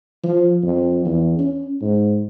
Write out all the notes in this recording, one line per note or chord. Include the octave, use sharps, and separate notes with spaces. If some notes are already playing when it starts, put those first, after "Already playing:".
F3
F2
E2
C#4
G#2